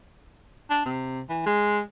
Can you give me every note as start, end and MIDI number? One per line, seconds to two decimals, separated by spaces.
0.70 0.81 62
0.86 1.21 48
1.30 1.43 52
1.46 1.79 56